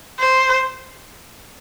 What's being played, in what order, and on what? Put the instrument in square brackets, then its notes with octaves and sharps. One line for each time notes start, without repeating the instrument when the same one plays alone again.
[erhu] C5